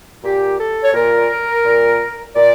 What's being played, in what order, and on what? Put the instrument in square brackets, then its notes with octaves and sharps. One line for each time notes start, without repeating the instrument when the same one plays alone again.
[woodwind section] A#2 G4
A4
C#5
A#2 A#4
A#2
A#2 D5